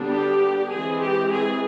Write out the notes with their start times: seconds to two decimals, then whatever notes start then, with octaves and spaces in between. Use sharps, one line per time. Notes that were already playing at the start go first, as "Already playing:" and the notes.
Already playing: D3 G3 B3 D4
0.10 G4
0.70 E3 G#3 C4 G#4
1.00 G4
1.30 G#4